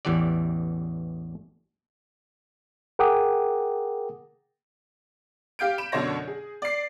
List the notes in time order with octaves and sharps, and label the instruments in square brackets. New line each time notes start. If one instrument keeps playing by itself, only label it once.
[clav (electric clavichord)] A1 E2 E3 G4 D5
[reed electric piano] G#4 A#4 F#5 G5 D6 D#6
[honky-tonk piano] G4 F5 G6 D7
B5 D7 E7
F#2 B2 D3 D4 C#5 A#6
G#4
D5 C7